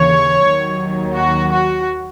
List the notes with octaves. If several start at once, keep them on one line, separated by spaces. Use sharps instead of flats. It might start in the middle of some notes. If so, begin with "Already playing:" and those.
Already playing: D#2 C#3 E3 C#5
D#2 D#3 F#3
F#4
F#4